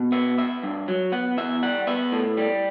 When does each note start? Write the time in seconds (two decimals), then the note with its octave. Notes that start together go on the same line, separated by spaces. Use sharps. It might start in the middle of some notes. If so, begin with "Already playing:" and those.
Already playing: B2
0.12 B3 E5
0.38 B3 E5
0.63 G2
0.88 F#3
1.12 B3 F#5
1.37 E2 E5
1.63 G3 F#5
1.87 B3 E5
2.12 A2
2.37 G3